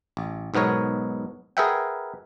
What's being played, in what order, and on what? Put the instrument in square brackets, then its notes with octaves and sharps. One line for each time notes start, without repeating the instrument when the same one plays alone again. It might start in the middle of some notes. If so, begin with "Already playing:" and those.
[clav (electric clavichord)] A1
B1 G#2 B3 A#4 C#5
G#4 A#4 B4 E5 F#5 G5